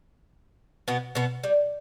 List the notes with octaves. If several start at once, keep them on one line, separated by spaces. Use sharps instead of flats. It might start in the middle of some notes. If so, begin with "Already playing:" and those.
B2 B3
B2 B3
G3